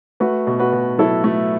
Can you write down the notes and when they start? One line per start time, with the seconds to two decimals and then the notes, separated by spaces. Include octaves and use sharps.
0.20 A3 F#4 B4
0.47 B2
0.60 F#4 B4
0.73 B2
0.98 F#3 E4 A4
1.24 A3